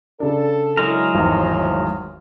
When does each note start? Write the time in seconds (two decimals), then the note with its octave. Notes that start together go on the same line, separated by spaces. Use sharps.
0.20 C#3 D4 A4
0.77 F#3 G#3 E4 A#4
1.15 G#1 E2 A2 D#3 F3